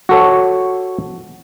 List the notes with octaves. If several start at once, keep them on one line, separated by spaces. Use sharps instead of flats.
F#4 A4 C#5